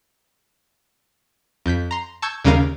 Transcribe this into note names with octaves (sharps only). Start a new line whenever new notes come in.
F2 G6 B6
A#5 C6
A5 C#6 E6 G6 G#6
D#2 C#3 G3 C#4 A#4 F5